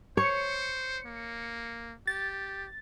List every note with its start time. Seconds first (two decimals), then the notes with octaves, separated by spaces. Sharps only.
0.17 C5 C#5 C#7
1.05 A#3
2.07 G4 A6